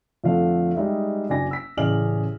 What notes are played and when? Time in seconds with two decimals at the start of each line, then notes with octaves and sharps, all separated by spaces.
0.24 F2 D3 F3 A3 F5
0.75 G3 G#3 D#4 E5
1.29 F#1 D4 F#4 G#5 A#6
1.51 E6 B6
1.77 A1 C#3 G#4 D5 F6 F#7